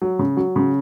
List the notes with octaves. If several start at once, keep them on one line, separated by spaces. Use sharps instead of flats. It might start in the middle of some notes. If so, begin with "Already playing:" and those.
F#3
C#3
F#3
C#3